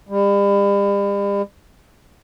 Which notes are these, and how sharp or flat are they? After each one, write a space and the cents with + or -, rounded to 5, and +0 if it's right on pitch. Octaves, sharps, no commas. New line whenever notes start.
G3 +40